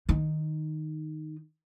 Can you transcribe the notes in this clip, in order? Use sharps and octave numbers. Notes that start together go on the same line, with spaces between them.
D#3 D#4